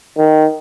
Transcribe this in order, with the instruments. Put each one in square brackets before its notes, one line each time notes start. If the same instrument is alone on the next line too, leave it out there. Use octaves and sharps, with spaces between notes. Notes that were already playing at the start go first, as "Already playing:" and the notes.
[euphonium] D#3